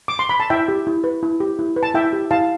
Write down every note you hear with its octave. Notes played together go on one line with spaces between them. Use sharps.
D6
C6
B5
A5
E4 E5 G5
G4
E4
B4
E4
G4
E4
B4
A5
E4 E5 G5
G4
E4 F5 A5